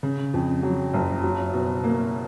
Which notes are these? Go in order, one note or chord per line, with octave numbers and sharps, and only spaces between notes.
C#3
F2
F#3
F#1
F#3
B2
A#3